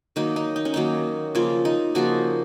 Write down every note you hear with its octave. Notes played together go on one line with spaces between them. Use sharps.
D#3 F#3 A#3 D#4
D#4
D#4
C#4
D#3 F#3 A#3 D#4
C#3 F3 A#3 F4
D#4
C#3 F3 A#3 F#4